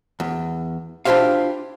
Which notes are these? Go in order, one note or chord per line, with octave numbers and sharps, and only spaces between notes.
E2
D4 E4 F4 G4 C5 F5